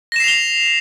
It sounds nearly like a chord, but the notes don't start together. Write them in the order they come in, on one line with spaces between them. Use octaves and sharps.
A#6 E7 C7 F7 G7